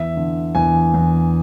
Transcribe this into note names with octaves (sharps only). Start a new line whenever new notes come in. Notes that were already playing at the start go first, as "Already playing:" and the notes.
Already playing: E2 E5
D3
E2 G#5
E2